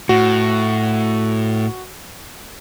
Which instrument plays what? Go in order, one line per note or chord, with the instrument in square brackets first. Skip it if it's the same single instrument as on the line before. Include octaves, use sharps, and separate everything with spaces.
[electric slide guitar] A2 [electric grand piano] F#4